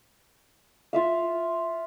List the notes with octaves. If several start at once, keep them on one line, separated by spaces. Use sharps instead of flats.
F4 E5 F5